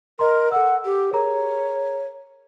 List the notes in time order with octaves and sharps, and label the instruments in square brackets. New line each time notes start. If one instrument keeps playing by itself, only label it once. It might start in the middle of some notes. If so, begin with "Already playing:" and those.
[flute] A#4 [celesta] D#5 A#5 C6
[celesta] A4 E6 [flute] F#5
[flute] G4
[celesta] G#4 A#4 A#5 [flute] C#5